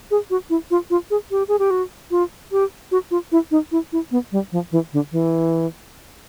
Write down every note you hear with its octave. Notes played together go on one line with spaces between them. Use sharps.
G#4
F#4
E4
F4
F4
G#4
G4
G#4
G4
F#4
F4
G4
F#4
F4
E4
D#4
E4
E4
B3
G3
F3
E3
D3
E3